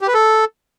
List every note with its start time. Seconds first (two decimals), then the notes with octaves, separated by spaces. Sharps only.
0.01 G4
0.08 B4
0.14 A4